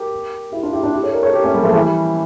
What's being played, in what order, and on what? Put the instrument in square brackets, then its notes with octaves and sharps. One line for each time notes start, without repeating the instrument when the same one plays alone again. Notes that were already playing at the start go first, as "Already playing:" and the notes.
Already playing: [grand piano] G4 A#4
E4 G4
D4 F4
E4 G4
D4 F4
E4 G4
A4 C#5
A#4 D5
A4 C#5
G4 A#4
A3 C#4
G3 A#3
F3 A3
E3 G3